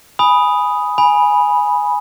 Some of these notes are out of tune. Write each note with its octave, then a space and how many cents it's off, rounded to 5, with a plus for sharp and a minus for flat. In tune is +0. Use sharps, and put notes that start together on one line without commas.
G#5 +0 B5 +0 D#6 +0
G#5 +0 B5 -10